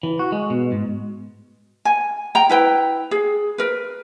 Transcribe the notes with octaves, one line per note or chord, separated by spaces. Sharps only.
E3
F#4
G#3
B2
G#2
G#5
G5 A#5
E4 B4 G5
G#4
A#4 B4